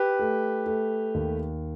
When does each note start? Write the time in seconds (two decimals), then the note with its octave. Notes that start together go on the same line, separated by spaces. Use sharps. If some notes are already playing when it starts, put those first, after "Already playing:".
Already playing: G4 B4
0.19 A3
0.66 A3
1.14 D#2